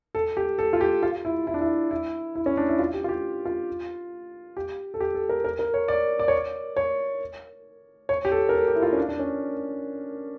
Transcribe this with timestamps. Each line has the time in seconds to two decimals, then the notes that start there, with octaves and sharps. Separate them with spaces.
0.15 A4
0.37 G4
0.59 A4
0.73 F4
0.81 G4
1.03 F4
1.25 E4
1.47 E4
1.54 D4
1.61 E4
1.91 E4
2.35 E4
2.46 C#4
2.57 D4
2.69 E4
2.79 F4
2.94 G4
3.04 F4
3.09 G4
3.45 F4
4.57 G4
4.94 A4
5.00 G4
5.15 A4
5.29 A#4
5.44 A#4
5.59 A#4
5.74 C#5
5.88 D5
6.19 D5
6.28 C#5
6.37 D5
6.76 C#5
8.09 C#5
8.25 G4
8.32 A4
8.49 A#4
8.54 A4
8.68 G4
8.75 E4
8.82 F4
8.93 C#4
8.98 D4
9.09 D4
9.19 C#4